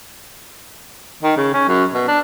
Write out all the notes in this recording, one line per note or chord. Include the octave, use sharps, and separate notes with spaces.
D#3
C#3
C#4
F#2
B2
D4